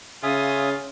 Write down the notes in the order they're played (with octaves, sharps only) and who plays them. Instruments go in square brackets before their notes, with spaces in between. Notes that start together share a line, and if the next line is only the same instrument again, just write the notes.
[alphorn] C#3 [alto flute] C#4 [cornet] F4 [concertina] E5 G#5 D#6